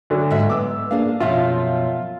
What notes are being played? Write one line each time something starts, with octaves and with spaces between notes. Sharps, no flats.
D2 D3 F#3
G#2 D#5 E5
B3 D6 E6
A#3 D4 G#4 F5
F#2 B2 F3 F4 E5 F5